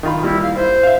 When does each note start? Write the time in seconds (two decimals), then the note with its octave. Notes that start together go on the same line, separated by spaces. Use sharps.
0.03 D#3 F4 B5
0.23 G3 A#3 E4
0.42 F5
0.56 E4 C5
0.83 E5 F5